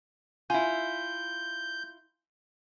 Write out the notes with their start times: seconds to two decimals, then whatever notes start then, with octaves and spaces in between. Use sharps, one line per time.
0.50 E4 F4 G#5 G6